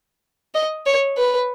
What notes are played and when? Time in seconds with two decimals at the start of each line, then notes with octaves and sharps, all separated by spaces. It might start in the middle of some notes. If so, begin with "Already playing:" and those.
0.54 D#5
0.86 C#5
1.17 B4